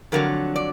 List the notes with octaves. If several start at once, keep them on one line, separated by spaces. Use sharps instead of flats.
F2 D3 F#3 A#4
D5